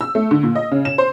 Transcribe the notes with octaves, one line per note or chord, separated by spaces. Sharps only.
E6
A3
D3
A#2
D#5
C#3
E7
C5